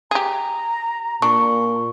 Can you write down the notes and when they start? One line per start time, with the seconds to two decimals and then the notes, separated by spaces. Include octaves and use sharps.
0.11 G4 G#4 A#5
1.22 A#2 D4 C#6